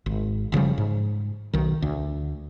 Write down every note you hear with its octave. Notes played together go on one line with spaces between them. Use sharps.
G#1
F#1 C#3 F3 G3
G#2
B1 D#3
D2